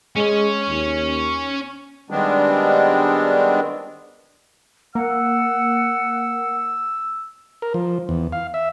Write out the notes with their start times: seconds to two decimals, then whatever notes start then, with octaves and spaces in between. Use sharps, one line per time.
0.16 G#3 C#4 C#5
0.68 D#2
2.10 D#3 G3 G#3 B3 C4 D4
4.95 A#3 F#5 E6
7.62 A#4
7.74 F3
8.09 E2
8.33 F5
8.54 E5